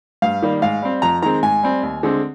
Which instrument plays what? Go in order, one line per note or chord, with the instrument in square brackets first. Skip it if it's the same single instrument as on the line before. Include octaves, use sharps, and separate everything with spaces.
[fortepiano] G2 F5
D#3 G3 A#3
G#2 F5
G3 C4
F2 A#5
D#3 G#3 C4 A#5
G#2 G#5
G3 C4
D#2
D3 G#3 C4